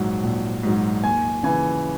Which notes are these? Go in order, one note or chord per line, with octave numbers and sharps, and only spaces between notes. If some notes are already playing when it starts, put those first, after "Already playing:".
Already playing: A#1 G#2 F#3
A#1
G#2 F#3
D#2 G#5
C#3 E3 G#5